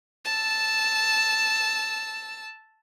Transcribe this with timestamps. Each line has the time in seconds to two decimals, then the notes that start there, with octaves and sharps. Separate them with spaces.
0.25 A5 E6